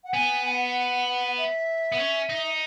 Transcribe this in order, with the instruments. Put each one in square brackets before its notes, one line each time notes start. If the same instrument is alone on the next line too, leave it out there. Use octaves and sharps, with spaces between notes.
[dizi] F#5
[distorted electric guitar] B3 [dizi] G#5
[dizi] G#5
F#5
E5
[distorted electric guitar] B3
C#4
D#4